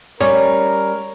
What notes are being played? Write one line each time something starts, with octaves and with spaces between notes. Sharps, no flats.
G3 C#4 A#4 C#5